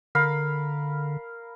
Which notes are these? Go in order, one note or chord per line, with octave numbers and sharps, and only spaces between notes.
D3 A#4 F5 B5